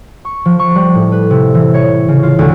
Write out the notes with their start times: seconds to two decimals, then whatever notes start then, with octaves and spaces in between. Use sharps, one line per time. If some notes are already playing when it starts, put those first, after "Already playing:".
0.25 C#6
0.45 F3
0.59 C#6
0.75 G3
0.95 A2
1.12 B4
1.30 C3
1.54 E3
1.74 C#5
2.08 C#3
2.23 F4
2.39 D2